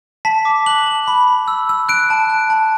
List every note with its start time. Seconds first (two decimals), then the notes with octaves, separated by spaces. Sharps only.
0.25 A5 B6
0.45 D6
0.66 F#6 F#7
0.86 A5
1.08 B5
1.27 B5
1.48 E6
1.69 E6
1.89 F#6 D7
2.10 A5
2.30 F#6
2.50 A5